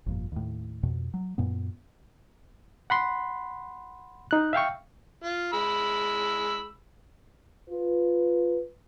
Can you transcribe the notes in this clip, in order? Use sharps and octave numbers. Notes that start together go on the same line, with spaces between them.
G1 F2 A#2
D#2 A2
F2 B2
F#3
F#2 A#2 B3
F#5 B5 C6
D#4 F#6
E5 F5 G5 C#6
F4
G#3 B5 E6
F4 B4